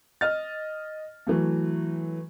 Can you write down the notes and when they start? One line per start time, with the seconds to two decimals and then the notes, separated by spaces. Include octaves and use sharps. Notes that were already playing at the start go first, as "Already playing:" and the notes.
0.21 D#5 F6 A6
1.27 E3 F#3 A3